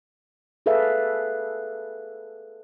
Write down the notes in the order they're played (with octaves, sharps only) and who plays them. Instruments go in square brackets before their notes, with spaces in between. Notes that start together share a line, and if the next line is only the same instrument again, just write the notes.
[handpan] G#4 A4 B4 D5 E5 F5